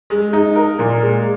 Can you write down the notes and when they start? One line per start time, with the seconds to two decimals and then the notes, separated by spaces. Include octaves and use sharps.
0.10 G#3
0.33 D#4
0.56 A#4
0.79 A#2
1.02 G#3